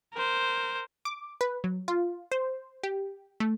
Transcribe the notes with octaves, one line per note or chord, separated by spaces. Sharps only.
A#4 C5
D6
B4
F#3
F4
C5
G4
A3